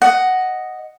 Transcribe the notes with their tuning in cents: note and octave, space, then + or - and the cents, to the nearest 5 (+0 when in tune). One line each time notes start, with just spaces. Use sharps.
D#5 +0 F#5 +5